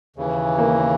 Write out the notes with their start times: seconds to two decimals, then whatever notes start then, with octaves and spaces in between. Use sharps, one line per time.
0.16 D#2 C#3 E3
0.58 A#3